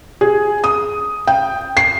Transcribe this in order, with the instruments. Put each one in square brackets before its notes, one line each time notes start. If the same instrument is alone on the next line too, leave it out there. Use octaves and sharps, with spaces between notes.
[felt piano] G#4
D#6
G5
C7